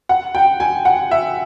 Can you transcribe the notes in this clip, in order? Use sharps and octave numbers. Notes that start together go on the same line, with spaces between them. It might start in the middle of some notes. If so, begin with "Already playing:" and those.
F#5
G5
G#5
F#5
E5